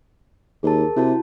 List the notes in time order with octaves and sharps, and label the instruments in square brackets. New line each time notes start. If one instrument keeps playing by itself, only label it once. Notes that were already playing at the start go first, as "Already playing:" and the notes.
[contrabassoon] D#2 [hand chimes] G#4 A#4 A5
[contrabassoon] C3 [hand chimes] E4 F#4 A5